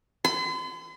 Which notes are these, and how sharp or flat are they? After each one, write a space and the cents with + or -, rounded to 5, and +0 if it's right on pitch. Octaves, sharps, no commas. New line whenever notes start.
C6 -45